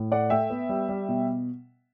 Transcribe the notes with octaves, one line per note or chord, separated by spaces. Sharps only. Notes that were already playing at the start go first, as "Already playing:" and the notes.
Already playing: A2
A3 D5 F#5
A3 E5 G5
B3
G3
G3
B2